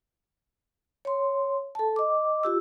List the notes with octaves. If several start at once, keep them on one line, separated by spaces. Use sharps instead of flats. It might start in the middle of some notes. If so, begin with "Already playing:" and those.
C#5 C6
A4 A5
D#5 D6
F4 G4 E6